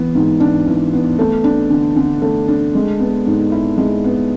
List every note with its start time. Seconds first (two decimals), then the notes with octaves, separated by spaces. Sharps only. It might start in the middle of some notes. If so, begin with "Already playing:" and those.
Already playing: E3 B3
0.15 G#2
0.40 D4
0.67 E3
0.93 B3
1.19 A3
1.44 D4
1.70 D3
1.96 D3
2.22 A3
2.48 D4
2.75 G#3
3.00 B3
3.27 G#2
3.52 E4
3.78 G#3
4.04 B3